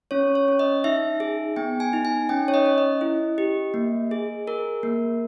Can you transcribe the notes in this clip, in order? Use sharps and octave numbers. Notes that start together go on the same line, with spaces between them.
C#4 C#5
C#5
C#4
D#5
D#4 E5
G#4
B3 G5
G#5
D#4
G#5
C#4 G5
C#5
D#5
C#4
D#5
E4
G4
A#3
G#4
G#4 A#4
A#3